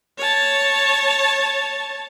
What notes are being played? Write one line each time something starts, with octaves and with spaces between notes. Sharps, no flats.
C#5 A5